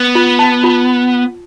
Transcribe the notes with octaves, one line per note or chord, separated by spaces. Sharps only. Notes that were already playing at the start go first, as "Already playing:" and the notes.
Already playing: B3
F4
A5
F4